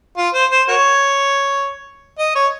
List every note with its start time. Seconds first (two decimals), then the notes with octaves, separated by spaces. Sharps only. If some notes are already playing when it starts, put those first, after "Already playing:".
0.17 F4
0.34 C5
0.51 C5
0.68 F#4 A#4 C#5
2.19 D#5
2.35 C#5